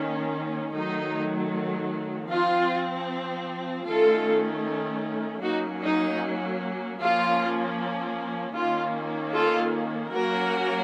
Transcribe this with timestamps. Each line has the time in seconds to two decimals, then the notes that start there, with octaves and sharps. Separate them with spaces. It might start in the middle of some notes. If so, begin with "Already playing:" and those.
Already playing: D#3 A#3 C#4
0.72 D#3 F#3 A3 D#4
2.28 F3 C4 F4
3.85 D#3 A3 C#4 F4 A4
5.42 F#3 A#3 C#4 D#4 F#4
5.81 D#4
6.99 F3 A#3 C#4 F4
8.55 D#3 A#3 C#4 F4
9.34 F4 A4
10.12 F#3 A#3 C#4 F#4 A#4